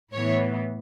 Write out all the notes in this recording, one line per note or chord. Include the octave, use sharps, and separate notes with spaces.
A2 E3 B3 C#5